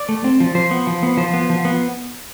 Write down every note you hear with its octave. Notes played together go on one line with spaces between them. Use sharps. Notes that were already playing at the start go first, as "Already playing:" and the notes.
Already playing: D5
A3
C4
F3
F3 C5
B3
F3
B3
F3 C5
B3
F3
B3